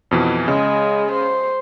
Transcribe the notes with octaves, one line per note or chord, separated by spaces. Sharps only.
F2 B2 E3
C#3 G#3
C5